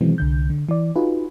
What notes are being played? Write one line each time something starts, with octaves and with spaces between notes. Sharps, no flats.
B2 D#3 E3 F#3 G#3 C4
C2 D3 G6
D3
E3 D5
D#4 F4 F#4 G#4 B4